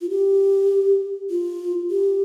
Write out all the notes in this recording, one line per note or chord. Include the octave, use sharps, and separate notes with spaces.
F4
G4
F4
G4